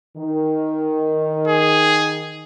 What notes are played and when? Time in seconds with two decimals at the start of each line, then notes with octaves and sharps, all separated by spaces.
0.17 D#3
1.47 G#4